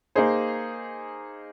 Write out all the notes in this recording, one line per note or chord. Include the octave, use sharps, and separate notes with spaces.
A#3 D#4 G#4 C5